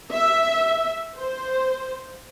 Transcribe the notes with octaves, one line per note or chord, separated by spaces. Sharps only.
E5
C5